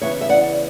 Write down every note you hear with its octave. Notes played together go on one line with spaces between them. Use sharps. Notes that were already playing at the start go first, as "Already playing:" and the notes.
C#3 E3 B3 E4 C#5 E5
E5
D5 F#5